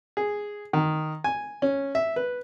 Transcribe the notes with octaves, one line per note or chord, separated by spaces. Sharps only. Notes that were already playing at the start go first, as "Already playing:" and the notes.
G#4
D#3
G#5
C#4
E5
B4